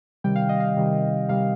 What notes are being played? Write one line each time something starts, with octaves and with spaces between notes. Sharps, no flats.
C3 D#3 G3 G5
F5
D#5
F5
C3 D#3 G3
C3 D#3 G3 F5